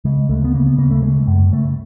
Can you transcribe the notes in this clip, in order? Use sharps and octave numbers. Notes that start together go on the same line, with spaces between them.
C#3 G#3
D2 A3
B3
C#3 A#3
B3
C#3 A#3
A3
C#3 G#3
F#2
C#3 A3